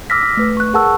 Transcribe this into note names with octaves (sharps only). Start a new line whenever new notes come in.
D6 E6 F6 A#6 B6
A3 B4
C#6 F#6
G#4 A#4 F#5 A5 C#6 E6